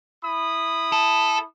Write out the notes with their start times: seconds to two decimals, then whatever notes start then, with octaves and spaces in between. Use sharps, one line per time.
0.23 E4 B5 D#6
0.92 A4